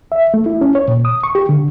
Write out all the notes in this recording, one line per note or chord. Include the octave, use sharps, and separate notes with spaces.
E5
A3
E4
C#4
C#5
A#2
D#6
C#6
G4
D3